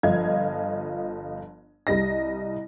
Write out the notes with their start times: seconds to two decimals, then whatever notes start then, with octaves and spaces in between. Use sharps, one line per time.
0.03 G1 F3 D#5 F5 G#6
1.87 C2 G3 D#5 A#6